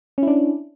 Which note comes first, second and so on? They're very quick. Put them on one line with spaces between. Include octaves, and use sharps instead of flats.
C#4 E4 D4